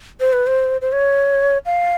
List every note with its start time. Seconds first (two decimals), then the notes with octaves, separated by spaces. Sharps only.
0.20 C5
0.33 B4
0.47 C5
0.81 C5
0.92 C#5
1.66 F5